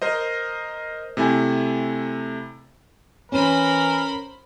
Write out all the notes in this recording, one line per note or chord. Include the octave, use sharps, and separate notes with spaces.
A#4 C5 D#5
C3 A3 E4 G#5
E3 C#4 A#4 C5 B5